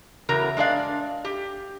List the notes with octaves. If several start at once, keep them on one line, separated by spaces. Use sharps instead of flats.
E2 C#3 F#3 A#4 A#5
G#3 D4 D5 F5
G4